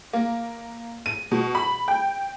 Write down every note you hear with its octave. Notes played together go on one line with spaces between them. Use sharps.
A#3
D#7
B2
B5
G5